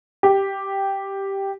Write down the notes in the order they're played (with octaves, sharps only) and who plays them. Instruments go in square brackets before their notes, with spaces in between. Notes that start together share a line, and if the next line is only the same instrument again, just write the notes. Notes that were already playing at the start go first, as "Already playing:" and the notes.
[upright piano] G4